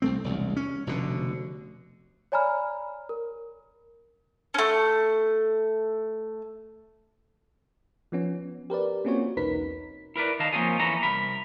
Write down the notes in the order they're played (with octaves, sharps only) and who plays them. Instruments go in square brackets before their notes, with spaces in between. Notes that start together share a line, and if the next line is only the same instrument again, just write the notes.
[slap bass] C2 A3 C4
E1 C2
C#4
F1 B2 D3
[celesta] C#5 D5 G#5 A#5 B5 F6
A#4
[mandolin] A3 C#4
[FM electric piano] F3 B3 C#4
G4 A#4 B4 D5
A#3 C4 C#4 F4 F#4 C#5
B1 E2 D#4 A#4 B4 B6
[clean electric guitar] E4 A#4 B4 D5
D#3 D#5 F5 A5
F3 A#3 C4 C#4 F4 G#4
E2 E3 C#4 A4 A#5
C2 C3 A#4 B5